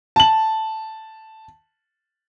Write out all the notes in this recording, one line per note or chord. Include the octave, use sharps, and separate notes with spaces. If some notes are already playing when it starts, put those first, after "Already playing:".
A5 F#7